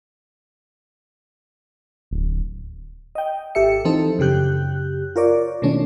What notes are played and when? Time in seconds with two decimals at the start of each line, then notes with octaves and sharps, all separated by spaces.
2.11 D1
3.15 D#5 G5
3.55 G#1 G4 A4 E5 C#7
3.85 E3 F3 C4 D#4 A4
4.19 F#2 C#3 G4 F#6 G6
5.16 F4 A#4 C#5 D5
5.62 B2 D#3 A3 C#4 D4